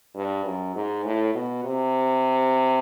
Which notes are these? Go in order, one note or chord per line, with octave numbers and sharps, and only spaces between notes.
G2
F#2
G#2
A2
B2
C3